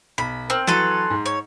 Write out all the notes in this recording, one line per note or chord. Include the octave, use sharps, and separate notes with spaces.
B1 B5
C4 A#4
E3 F#3 A4 B4 C6
G#2
C#5